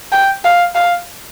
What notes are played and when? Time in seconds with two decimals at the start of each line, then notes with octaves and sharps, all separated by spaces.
0.12 G5
0.44 F5
0.75 F5